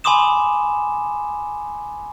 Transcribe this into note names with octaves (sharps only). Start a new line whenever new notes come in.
G#5 B5 C6 D6 D#6 E7